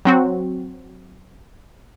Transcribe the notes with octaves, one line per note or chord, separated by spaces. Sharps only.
F#3 C4 F#4